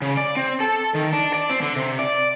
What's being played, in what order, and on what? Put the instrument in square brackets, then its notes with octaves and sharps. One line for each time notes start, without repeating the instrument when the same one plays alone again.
[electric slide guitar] C#3
D5
C4
A4
D#3
D4
D5
C4
D3
C3
D5